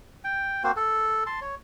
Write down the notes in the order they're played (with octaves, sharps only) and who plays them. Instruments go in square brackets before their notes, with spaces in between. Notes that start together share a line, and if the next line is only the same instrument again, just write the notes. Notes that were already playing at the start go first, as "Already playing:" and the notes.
[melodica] G5
A#3 C4 F#4 C5
A4
A5 C6
C#5